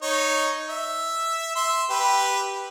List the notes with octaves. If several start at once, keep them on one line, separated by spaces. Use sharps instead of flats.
D#4 C#5
E5
E5 C6
G4 B4